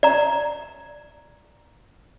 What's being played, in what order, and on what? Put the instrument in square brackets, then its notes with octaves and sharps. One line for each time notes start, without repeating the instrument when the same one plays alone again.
[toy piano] D5 A#5